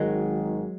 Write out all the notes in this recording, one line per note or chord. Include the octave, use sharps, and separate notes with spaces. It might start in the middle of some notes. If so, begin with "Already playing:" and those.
Already playing: G#1 G#2 D#3 F#3 G#3